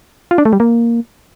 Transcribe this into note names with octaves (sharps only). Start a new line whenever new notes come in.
F4
D4
A3
G3
A#3